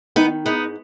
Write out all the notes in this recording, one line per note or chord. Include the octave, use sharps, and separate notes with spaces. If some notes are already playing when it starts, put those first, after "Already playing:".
D#3 B3 D#4
G#2 B3 D#4